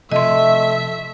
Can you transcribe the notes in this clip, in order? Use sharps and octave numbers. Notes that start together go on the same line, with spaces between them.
C3 F3 A3 D#5 E5 C6